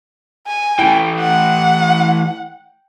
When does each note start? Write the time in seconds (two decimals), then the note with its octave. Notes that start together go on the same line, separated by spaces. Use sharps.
0.47 G#5
0.79 E3 A3 G5
1.20 F#5